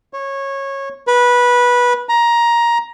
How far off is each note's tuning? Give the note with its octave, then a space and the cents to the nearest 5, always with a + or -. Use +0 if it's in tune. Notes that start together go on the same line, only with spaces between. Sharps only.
C#5 -20
B4 -15
A#5 +15